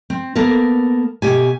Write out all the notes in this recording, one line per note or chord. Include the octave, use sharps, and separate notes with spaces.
C4
A#3 B3 A4 A#4
B2 G4 G#5